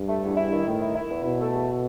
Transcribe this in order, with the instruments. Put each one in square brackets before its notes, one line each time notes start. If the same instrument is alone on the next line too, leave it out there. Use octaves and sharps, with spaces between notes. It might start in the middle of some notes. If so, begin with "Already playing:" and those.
Already playing: [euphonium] G2
[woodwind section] A3
E2
E4
D#3
[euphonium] A2 [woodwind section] D#3
[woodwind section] E4
E4
E2
[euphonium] B2 [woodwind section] E4
[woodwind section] A3
E2